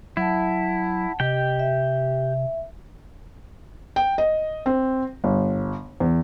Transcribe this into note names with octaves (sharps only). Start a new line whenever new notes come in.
F#3 E4 F#5 A5
C3 G4 D#5 G5
E5
G5
D#5
C4
G1
E2